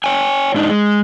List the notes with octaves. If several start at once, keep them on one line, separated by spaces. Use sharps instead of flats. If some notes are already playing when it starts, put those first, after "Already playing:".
C#5 G5 G#5
G#2 D4 D#4
G#3